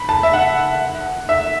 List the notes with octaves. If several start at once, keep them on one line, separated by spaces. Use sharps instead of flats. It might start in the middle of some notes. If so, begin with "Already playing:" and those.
Already playing: B5
A5
E5
F#5
E5